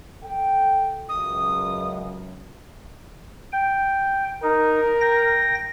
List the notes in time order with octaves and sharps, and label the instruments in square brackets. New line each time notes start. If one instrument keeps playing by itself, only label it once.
[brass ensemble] A4 G5
[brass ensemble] C#2 F#2 [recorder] D#6
[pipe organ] G5
[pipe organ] D#4 [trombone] A#4
[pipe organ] G5 A#6